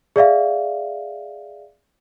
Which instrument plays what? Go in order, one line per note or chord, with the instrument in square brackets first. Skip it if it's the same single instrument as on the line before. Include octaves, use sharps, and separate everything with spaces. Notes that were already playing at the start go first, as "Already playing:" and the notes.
[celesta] G#4 D5 E5 F5